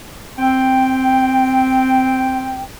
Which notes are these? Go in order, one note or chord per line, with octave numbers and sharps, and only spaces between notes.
C4 G5